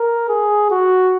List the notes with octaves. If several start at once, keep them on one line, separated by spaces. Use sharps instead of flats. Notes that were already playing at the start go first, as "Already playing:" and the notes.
Already playing: A#4
G#4
F#4